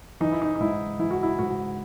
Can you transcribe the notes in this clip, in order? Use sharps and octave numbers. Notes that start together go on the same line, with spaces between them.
E3 D#4
E4
D#4
D#4
G#2 E4
E3 E4
F#4
E4
G#2 F#4